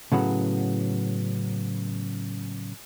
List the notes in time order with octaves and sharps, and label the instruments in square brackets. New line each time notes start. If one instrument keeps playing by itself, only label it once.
[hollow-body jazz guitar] A2 C#3 F#3 B3